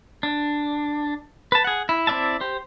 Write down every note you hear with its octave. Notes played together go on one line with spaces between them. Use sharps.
D4
B4 A5
G#4 F#5
E4
C4 E4 D5 E5 A5
G4 C5